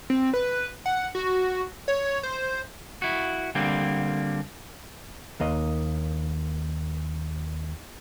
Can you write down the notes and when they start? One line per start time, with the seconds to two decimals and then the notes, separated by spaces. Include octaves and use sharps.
0.10 C4
0.34 B4
0.86 F#5
1.15 F#4
1.88 C#5
2.23 C5
3.02 E4 F#4
3.55 D3 G3 A#3 C4
5.40 D#2 A#3 D#5